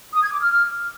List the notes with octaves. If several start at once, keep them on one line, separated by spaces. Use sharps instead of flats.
D#6
G#6
D6
F6